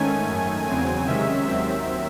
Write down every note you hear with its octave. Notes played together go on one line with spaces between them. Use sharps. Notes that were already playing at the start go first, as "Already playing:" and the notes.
Already playing: G#2 D#3 A3 C#4 G#5
F#2 D#3 A3
E2 C#3 F#3 C4 G#5
C3 D#3 G#3 C#4 E5
D#2 D#3 F#3 C4 E5